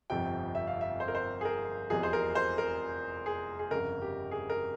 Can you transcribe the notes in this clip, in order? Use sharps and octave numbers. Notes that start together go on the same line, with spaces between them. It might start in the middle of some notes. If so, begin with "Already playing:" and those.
G1 F2 C3 F3 G5
E5
F5
E5
C5
A#4
C5
G#4
A#4
F1 E2 C3 F3 G#4
C5
A#4
C5
A#4
G#4
G#4
G1 F2 C#3 A#4
G4
G#4
A#4